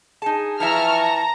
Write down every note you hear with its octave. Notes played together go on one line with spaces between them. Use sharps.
D#4 G#4 A5
E3 F3 E4 E5 A5 A#5 C#6 F6
A#5